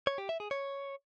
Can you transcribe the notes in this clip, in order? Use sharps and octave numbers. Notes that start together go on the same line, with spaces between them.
C#5
G4
E5
G#4
C#5